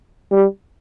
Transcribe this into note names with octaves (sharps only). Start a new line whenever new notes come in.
G3